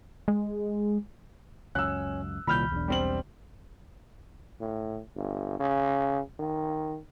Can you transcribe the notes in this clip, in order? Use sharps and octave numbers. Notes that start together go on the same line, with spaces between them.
G#3
C#2 F#2 C#4 E6 F#6
C2 A#2 D#3 B5 F6 G6
E1 B1 E2 D4
G3 C4 F#7
A2
G1
C#3
D#3